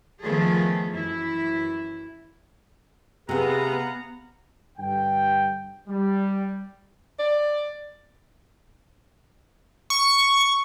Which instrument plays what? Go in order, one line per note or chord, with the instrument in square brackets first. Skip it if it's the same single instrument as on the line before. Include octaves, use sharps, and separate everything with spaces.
[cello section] D#3 F3 A3 B3 G#4 A4
F#2 E3 E4
[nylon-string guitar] C3 G#4 [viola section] B3 [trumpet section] F5 F#5 A#5
[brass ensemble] G2 D3 G5
G3
[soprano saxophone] D5
[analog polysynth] C#6